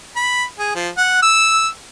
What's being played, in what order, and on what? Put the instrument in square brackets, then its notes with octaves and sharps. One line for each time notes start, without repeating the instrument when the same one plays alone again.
[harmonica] B5
G#4
F3
F#5
E6